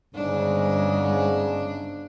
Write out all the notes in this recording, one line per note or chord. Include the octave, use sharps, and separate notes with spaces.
G1 G#2 C#3 G#3 D4